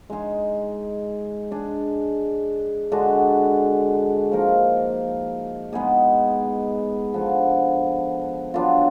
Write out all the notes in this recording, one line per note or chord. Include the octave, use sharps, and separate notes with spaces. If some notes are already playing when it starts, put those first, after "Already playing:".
G#3 D#4 G#4
G#3 D4 G#4
D3 G#3 D4 F#4
F3 A#3 D#4 A#4
G#3 B3 D#4 G#4
D3 F3 B3
F#3 B3 D4 F4